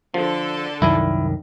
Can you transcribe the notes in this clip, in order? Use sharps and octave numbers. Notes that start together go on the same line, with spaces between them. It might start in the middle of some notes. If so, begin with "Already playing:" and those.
D3 F3 A4
C2 F#2 D#3 E4